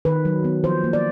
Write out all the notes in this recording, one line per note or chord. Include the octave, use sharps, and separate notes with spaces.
D#3 B4
F#3
B3
F3 C5
A#3
D5